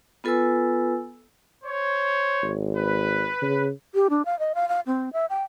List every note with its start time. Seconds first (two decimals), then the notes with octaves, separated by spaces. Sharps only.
0.24 B3 F4 A4 B4 G#5 E6
1.64 C5 C#5
2.42 G#1
2.76 B4
3.41 C#3
3.95 G4
4.10 D4
4.25 F5
4.39 D#5
4.55 F5
4.69 F5
4.86 C4
5.13 E5
5.30 G5